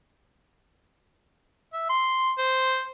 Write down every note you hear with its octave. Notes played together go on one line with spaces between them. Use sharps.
E5
C6
C5